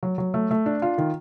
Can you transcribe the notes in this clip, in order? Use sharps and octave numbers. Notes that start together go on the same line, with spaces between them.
F#3
F#3
A3
A3
D4
F4
D#3